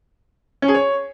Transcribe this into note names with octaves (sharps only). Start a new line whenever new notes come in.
C#4
G#4
C#5